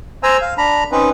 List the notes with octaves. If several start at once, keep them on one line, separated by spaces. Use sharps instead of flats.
C5 G#5 A#5 E6
F5
D4 A#5 B5
C4 C#4 D#4 B4